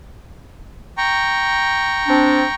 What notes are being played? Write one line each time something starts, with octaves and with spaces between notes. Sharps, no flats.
G5 A#5 C#6
C4 D4